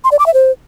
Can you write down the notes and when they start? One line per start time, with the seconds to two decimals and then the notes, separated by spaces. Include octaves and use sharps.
0.04 C6
0.12 D5
0.19 D6
0.26 E5
0.34 C5